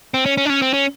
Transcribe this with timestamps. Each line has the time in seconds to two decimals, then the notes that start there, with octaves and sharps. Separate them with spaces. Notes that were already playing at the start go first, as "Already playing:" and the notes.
0.14 C4
0.26 C#4
0.37 C#4
0.45 D4
0.50 C#4
0.62 C4
0.74 C#4